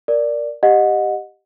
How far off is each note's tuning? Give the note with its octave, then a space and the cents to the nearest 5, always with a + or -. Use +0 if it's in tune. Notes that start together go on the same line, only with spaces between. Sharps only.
A#4 +0 D5 +0
G4 +0 D#5 -10 F#5 -25